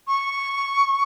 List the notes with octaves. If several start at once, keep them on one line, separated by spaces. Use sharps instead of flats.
C#6